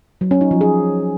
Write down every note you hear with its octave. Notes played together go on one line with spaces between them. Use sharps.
F#3
C#4
D#4
F3
G#4